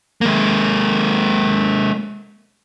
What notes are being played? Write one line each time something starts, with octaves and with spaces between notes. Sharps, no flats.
G#3 A#3